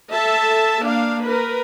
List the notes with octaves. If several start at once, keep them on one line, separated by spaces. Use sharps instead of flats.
A4 E5 A5
A#3 D4 F5
A#4 B4